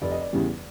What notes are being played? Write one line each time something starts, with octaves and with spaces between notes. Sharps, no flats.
F1 D5
D#5
D5
E2 C#3 E3 G3